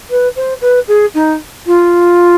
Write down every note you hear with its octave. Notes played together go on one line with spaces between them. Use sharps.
B4
C5
B4
G#4
D#4
F4